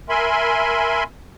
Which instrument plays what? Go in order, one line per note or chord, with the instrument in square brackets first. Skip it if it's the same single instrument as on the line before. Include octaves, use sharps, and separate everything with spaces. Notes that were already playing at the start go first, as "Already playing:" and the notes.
[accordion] A#4 E5 G#5 B5 C6